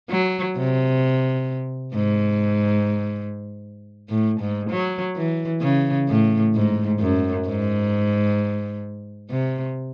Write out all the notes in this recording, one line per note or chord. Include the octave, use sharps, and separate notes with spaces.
F#3
C3
G#2
A2
G#2
F#3
E3
C#3
A2
G#2
F#2
G#2
C3